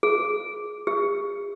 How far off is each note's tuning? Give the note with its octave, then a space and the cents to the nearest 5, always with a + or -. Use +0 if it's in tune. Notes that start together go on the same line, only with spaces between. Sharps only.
G#4 +15
G#4 -45